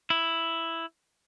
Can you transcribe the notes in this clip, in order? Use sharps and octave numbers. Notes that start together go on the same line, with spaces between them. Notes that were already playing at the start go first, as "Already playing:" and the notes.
E4